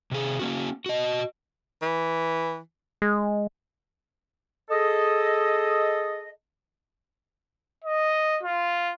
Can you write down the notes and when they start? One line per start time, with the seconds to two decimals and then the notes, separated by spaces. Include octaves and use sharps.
0.11 C3 G#4
0.39 A#3 C#4 F#4
0.86 F#4 D#5
1.82 E3
3.02 G#3
4.70 G#4 A4 D#5
7.84 D#5
8.43 F4